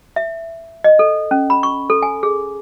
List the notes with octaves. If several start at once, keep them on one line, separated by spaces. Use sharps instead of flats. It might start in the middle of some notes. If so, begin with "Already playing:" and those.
E5
D#5
A4
C#4
B5
C#6
A4
G#5
G#4